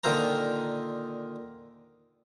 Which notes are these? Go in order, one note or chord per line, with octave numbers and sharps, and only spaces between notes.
A#2 D3 D#3 F4 C5 A#5